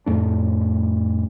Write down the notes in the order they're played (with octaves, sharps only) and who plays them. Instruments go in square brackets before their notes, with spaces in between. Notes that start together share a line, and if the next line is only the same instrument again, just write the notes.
[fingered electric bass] F2 A2 A3 D4